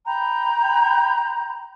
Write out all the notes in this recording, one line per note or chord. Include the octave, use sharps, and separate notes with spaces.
G5 A#5 B5 G6